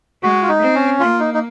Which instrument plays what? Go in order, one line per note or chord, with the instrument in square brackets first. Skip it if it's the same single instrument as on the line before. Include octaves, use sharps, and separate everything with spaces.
[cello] G#3 [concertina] F#4
[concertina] F4
D#4
[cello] C4
[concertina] C#4
[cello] A#3 [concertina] F4
[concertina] D#4
D#4